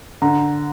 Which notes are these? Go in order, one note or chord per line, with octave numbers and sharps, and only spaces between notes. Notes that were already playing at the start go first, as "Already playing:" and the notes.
D3 A#5